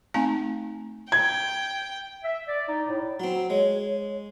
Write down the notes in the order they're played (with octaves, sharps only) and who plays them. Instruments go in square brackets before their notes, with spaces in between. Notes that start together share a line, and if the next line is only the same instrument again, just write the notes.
[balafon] A3 C4 D#4 F5 G#5 A#5
[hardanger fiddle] G5 [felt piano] G#6
[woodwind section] E5
D5
D#4
A2
[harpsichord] F#3 C4
[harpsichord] G#3 [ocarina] C#5